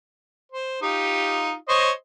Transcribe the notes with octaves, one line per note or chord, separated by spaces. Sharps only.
C5
D#4 F4 G4
C5 C#5 D#5